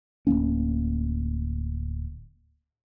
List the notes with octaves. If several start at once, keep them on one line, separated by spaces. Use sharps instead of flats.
D1 G1 A#3 C#4